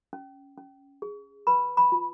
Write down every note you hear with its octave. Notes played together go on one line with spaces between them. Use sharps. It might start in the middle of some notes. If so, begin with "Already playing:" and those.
C#4
C#4
G#4
B4 B5
B5
F4